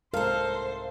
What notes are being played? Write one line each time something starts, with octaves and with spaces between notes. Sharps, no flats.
C2 G#2 A4 A#4 C5 F5 A5